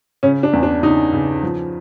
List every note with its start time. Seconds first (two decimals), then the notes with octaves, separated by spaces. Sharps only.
0.23 C#3 C#4
0.43 D4
0.53 E2
0.63 D4
0.83 C#3 D#4
1.13 C#3
1.43 F3